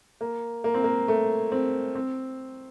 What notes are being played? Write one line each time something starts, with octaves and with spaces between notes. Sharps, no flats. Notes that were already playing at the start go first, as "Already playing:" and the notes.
A#3
A#3
C4
A#3
A3
C4
C4